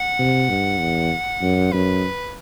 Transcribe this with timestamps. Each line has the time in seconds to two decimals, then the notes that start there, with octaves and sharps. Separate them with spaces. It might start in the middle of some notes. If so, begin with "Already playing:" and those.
Already playing: F#5
0.19 C3
0.49 G2
0.80 E2
1.42 F#2
1.72 F#2 B4